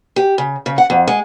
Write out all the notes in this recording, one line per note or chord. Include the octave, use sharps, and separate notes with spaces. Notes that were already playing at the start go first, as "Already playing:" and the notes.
G4
C#3
C#3
F#5
F2
G#3